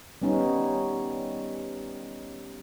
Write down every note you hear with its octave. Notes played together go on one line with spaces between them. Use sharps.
G3 B3 C#4 D#4